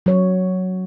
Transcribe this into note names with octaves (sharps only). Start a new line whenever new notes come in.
F#3 C#5